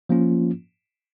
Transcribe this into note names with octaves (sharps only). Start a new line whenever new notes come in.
F3 A#3 C#4 F4